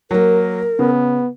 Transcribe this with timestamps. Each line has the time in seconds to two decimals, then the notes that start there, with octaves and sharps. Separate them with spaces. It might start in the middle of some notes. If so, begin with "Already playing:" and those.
0.11 F#3 A#3 A#4
0.79 C#3 B3